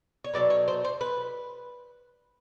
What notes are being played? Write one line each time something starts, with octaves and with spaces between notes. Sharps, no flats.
C#5
B2 F#3 A3 D5
C#5
C5
C5
B4